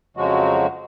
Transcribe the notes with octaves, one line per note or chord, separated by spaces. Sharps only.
F2 C#3 F3 F#3 G#3 F#4